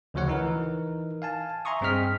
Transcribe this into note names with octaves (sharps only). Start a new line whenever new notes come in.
D2 C#3 F3 F#4 C#5 F#5
E3 D#4 A#4
F5 G#5 A5
E5 G#5 A#5 C6 C#6 D#6
G2 C4 G#4 D#5 F6 B6